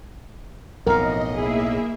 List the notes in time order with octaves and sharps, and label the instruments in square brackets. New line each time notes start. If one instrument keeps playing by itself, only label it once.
[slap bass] B1 A2 [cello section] F2 [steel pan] A#4 [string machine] D#5
[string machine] A#3 E5 [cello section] E4 G#4